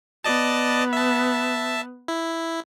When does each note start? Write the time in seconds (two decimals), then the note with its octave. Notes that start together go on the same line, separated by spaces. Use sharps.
0.25 B3 D5 D#5 A5
0.93 E5 A5
2.08 E4